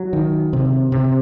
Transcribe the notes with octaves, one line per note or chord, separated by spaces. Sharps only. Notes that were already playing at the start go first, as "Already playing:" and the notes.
Already playing: F#3
D#3
C3
C3